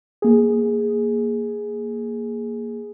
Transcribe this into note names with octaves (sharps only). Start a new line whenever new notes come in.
A#3 G#4